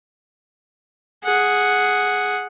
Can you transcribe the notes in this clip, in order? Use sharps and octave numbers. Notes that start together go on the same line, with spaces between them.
G#4 F#5